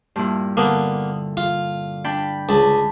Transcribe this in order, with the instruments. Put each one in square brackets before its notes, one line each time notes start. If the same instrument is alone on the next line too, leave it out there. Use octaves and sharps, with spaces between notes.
[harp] G2 A#2 E4
[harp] D3 [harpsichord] A#3 B3
[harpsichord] F4
[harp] D4 G5 B5
[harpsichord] C#2 [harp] A5 B5